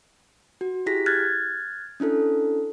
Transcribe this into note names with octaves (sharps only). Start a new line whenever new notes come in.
F#4
E4 G4 G#4 A#6 B6
F6 F#6 G#6 A6
C#4 D4 E4 A4